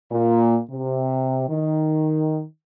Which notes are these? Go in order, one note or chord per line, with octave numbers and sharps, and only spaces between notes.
A#2
C3
D#3